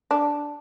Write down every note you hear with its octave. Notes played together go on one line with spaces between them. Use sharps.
D4